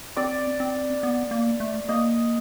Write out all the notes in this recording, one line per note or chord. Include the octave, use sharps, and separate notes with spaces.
C4 D5
C4
B3
A#3
A3
A#3 D#5